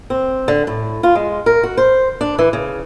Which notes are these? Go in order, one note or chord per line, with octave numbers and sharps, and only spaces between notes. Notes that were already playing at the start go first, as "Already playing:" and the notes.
C4
D3
A2
F4
G#3
A#4
F#4
C5
D4
E3
C#3